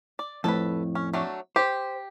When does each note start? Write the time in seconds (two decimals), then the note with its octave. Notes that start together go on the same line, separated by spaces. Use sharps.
0.19 D5
0.44 F2 A2 A4 B4
0.95 C#4
1.14 F#3 A3 D4
1.56 G4 C5